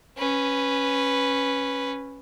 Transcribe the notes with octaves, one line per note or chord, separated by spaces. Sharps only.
C#4 B4